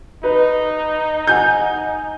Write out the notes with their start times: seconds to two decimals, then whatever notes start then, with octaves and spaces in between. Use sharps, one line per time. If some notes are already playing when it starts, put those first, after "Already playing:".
0.24 D#4 B4
1.27 F#5 G#5 G6